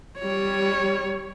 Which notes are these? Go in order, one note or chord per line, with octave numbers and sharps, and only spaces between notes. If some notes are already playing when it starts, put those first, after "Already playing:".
G3 C#5